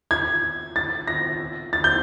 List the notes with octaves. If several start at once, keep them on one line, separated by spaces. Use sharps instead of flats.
G#6
A6
A#6
A6
G6